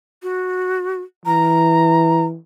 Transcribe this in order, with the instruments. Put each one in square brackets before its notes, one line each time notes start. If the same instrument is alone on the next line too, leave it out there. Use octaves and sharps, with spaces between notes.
[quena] F#4
[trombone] E3 [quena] A#5